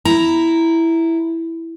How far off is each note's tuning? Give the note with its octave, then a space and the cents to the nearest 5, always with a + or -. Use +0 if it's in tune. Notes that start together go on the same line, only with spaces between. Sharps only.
E4 +0 A#5 +0